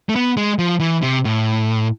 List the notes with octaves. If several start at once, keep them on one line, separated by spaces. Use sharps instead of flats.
A3
B3
G#3
F3
E3
C3
A2